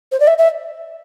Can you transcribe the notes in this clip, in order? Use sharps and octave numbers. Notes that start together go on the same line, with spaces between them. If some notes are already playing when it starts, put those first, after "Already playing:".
C5
D5
E5
E5